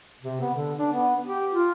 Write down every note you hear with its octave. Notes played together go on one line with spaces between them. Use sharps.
C3
B3
D3
D4
B3
G4
F4